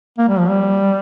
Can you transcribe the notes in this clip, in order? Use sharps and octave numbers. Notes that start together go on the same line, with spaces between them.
A#3
G3
F3
G3